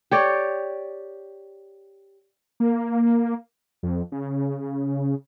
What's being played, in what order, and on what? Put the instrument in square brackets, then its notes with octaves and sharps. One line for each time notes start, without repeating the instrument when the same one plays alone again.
[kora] G4 C#5 D5
[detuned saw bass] A#3
F2
C#3